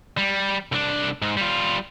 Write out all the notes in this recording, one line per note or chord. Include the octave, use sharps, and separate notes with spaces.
G3
C2 D4
G#2
G3 F4